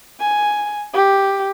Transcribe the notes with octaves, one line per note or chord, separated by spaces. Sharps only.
G#5
G4